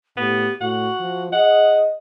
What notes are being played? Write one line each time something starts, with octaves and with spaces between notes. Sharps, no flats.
A2 B3 G4
A2 F#4 F#5
F3
G#4 D#5 F#5